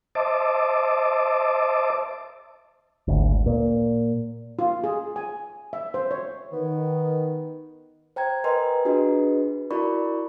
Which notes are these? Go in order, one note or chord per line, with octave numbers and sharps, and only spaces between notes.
C5 D#5 E5 A5 D6
G#1 D2
A#2
F4
G#4
G#5
E5
C5
C#5
D#3 B3
C5 G5 A#5 G#6
A#4 B4 D#5 G#5 A#5 C6
D4 F4 F#4 G#4 B4 D#5
E4 F#4 A#4 D5 B5 C#6